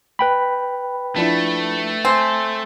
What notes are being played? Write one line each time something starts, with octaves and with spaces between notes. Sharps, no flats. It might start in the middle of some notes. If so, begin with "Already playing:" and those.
B4 G5 B5
F3 A3 D4 E4
C4 G#5